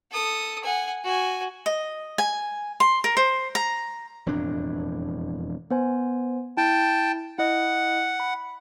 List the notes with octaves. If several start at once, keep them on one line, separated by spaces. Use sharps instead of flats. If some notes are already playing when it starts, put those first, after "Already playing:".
A4 D#6
F#5 G#5
F#4 G#5
D#5
G#5
C6
A#4
C5
A#5
E1 F2 A2 D4
B3 C5 G#5
E4 G5 A5
E4 D#5 F#5
B5